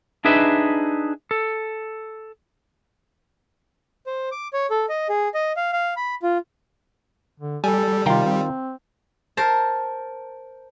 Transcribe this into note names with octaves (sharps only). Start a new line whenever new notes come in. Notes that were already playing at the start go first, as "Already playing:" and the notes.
D4 D#4 G#4 B4 E5
A4
C5
D6
C#5
A4
D#5
G#4
D#5
F5
F5
B5
F4
D3
G3 A4 G#5
C3 D#3 F4 F5 G5 A#5
C4
A#4 C5 A5